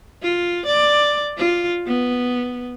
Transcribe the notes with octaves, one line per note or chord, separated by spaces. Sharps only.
F4
D5
F4
B3